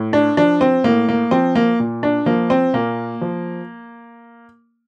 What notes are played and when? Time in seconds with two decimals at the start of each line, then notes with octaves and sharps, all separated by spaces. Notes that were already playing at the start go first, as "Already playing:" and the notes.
Already playing: A2
0.13 D4
0.37 F3 D4
0.61 C4
0.84 A2 A#3
1.08 A#3
1.31 F3 C4
1.55 A#3
1.80 A#2
2.03 D4
2.26 F3 A#3
2.50 C4
2.73 A#2 A#3
3.21 F3